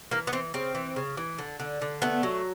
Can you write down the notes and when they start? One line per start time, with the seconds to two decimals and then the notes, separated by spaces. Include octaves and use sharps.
0.11 E3 A#3
0.27 B3
0.32 E3 C4
0.54 C#3 C4
0.75 E3
0.96 C#3
1.17 E3
1.39 D3
1.60 D3
1.82 D3
2.02 A3 B3
2.23 F#3